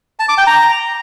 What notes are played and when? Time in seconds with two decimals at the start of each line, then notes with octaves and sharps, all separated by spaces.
0.19 A5
0.29 D6
0.38 G5
0.47 A#5